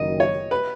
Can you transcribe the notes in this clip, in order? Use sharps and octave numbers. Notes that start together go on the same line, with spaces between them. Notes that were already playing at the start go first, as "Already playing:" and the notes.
Already playing: F#1 F#2 D#3 D#5
C#5
B4